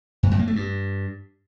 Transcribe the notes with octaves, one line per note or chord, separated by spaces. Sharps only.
G2
F#2
A#3
A3
G2